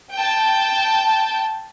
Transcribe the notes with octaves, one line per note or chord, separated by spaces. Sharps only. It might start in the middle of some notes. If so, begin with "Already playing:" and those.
G5 A5